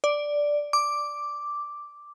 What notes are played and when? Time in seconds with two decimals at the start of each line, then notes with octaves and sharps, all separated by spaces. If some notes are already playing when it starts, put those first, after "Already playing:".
0.04 D5
0.73 D6